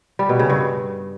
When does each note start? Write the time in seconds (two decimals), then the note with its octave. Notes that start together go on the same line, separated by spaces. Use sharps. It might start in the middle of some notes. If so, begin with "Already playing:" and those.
0.19 G3
0.29 B2
0.39 C#3
0.50 G2